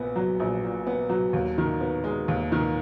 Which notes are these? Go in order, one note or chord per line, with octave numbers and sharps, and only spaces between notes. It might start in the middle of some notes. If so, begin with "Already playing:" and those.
Already playing: A#1 A#2 B3
F#3
A#1
A#2
B3
F#3
D#2
D#3
B3
G#3
D#2
D#3